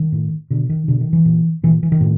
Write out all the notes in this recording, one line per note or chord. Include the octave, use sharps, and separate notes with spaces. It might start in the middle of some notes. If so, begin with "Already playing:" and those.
Already playing: D#3
A2
B2 D3
D#3
B2 D3
D#3
E3
A#2
A#2 E3
E3
D#3
A2